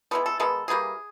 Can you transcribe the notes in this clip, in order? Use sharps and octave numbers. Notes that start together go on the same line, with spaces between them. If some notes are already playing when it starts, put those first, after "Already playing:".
E3 G#3 B3 A4
A4
D#3 G#3 B3 A4
E3 G3 A#3 G#4